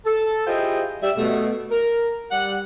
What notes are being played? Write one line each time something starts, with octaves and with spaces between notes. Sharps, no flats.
A4
E4 F4 G4 G#4 C5 D#5
G3 E5
B2 A3
A#4
G3 F#5